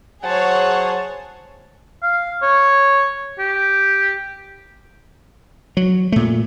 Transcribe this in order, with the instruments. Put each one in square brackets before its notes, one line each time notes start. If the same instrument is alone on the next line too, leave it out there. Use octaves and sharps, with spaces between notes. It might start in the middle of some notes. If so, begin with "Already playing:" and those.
[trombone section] F#3 C5 [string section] G#4 C#5 [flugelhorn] F#5 [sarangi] A5
[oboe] F5
C#5
G4
[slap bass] F#3
A#2 A3